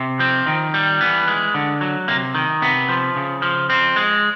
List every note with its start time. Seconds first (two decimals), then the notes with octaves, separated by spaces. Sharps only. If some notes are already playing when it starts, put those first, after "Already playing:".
Already playing: C3
0.19 F3 C4
0.46 D#3
0.74 G3
1.01 E3 B3
1.28 G#3
1.54 D3
1.81 F#3
2.08 C3 A#3
2.35 D#3
2.62 C3 B3
2.89 F3
3.16 C#3
3.42 F3
3.70 F3 C4
3.96 G#3